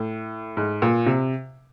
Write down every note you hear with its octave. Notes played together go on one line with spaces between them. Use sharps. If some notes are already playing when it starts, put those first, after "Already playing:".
Already playing: A2
G#2
A#2
C3